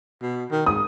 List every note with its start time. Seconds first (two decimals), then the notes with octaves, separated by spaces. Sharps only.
0.22 B2
0.52 D#3
0.66 G#2 D#6